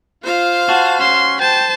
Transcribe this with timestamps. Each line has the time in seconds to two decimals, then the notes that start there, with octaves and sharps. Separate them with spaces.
0.23 F4 C5 F5
0.69 F#4 A5
1.00 C#4 C6
1.39 C5 G5 A5